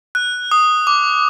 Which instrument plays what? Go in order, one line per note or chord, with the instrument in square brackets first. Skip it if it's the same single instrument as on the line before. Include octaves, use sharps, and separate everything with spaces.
[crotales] F#6
D#6
D6